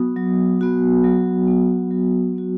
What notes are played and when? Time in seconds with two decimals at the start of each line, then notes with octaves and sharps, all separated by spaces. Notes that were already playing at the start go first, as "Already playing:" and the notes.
Already playing: F#3 B3 F#4 D#6
0.16 F#3
0.61 B3 F#4
1.04 F#3
1.48 B3 F#4
1.91 F#3
2.35 B3 F#4